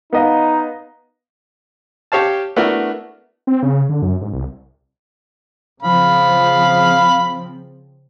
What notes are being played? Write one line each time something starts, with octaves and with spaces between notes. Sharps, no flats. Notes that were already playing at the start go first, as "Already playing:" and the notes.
B3 D#4 D#5 F5
G4 C#5 F5 A5
A3 B3 D4 E4 F#4 A#4
C4
C#3
D3
F#2
G#2
C2
C#3 F3 C4 F5 B5